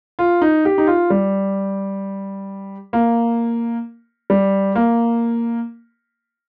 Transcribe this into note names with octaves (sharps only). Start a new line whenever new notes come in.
F4
D#4
G4
D#4
F4
G3
A#3
G3
A#3